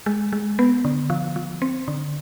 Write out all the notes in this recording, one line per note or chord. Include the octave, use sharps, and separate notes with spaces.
G#3
G#3
B3
D3
F3
F3
C4
D3